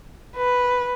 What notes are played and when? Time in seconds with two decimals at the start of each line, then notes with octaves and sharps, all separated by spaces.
0.36 B4